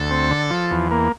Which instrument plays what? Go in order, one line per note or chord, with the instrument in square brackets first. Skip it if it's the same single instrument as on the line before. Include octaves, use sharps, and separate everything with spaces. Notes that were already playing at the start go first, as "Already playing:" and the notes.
Already playing: [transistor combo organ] D2 [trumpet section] A4
[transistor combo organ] C4
D3
F3
E2
A#3